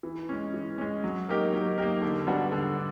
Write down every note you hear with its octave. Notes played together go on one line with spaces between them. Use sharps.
E3
G#3 C#4
E3
G#3 C#4
F#3
A#3 D#4 G4 A#4
F#3
A#3 D#4 G4 A#4
D3
G3 B3 D4 F#4
D3